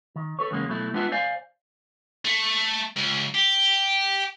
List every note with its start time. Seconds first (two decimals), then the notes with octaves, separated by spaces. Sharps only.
0.16 D#3
0.39 A4 B4 C#5
0.51 E2 C#3 G#3 A#3 C#4
0.69 B2 F#3 A3 E4
0.94 G#3 B3 D4 F4 B4 E5
1.12 C5 D5 F5 G#5
2.25 A3
2.96 C#2
3.35 G4